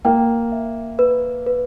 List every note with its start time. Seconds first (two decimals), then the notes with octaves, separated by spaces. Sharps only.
0.05 A#3 G5
0.52 E5
0.99 B4
1.46 B4